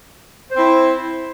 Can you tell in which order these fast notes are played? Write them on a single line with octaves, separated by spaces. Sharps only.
C5 C4 E4